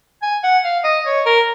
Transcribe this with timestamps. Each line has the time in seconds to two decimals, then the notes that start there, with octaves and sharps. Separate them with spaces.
0.22 G#5
0.43 F#5
0.64 F5
0.84 D#5
1.06 C#5
1.25 A#4